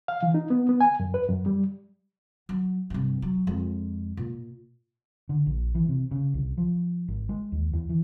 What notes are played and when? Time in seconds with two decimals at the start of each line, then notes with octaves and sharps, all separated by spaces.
0.08 F5
0.23 E3
0.34 D#4
0.50 B3
0.69 B3
0.81 G#5
1.00 F#2
1.14 B4
1.28 F#2
1.46 G3
2.49 F#3
2.90 G2 C3
3.22 F#3
3.47 F2 G#3
4.17 A#2
5.29 D3
5.47 A#1
5.75 E3
5.89 C3
6.11 C#3
6.34 C2
6.58 F3
7.08 G#1
7.29 G#3
7.52 D#2
7.73 E2
7.89 E3